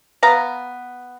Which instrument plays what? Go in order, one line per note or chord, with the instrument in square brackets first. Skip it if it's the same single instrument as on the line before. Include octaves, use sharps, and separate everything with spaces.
[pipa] B3 F5 A#5